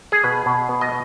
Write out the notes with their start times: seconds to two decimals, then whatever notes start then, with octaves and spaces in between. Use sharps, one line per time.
0.12 G#4
0.24 B2 B4
0.46 B2
0.69 B3
0.81 D#5